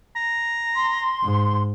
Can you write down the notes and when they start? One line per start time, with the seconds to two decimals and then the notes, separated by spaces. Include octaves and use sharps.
0.16 A#5
0.75 C6
1.23 G#2